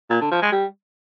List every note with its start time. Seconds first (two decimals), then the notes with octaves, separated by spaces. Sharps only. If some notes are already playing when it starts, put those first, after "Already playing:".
0.10 A#2
0.21 D3
0.32 F3
0.42 G#3
0.52 G3